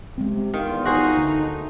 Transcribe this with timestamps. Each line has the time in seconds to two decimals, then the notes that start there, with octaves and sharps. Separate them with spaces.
0.18 C3 G#3 A3 C4
0.54 E2 D#3 F4
0.86 D#4 F#4 G#4 C5
1.17 D2 A3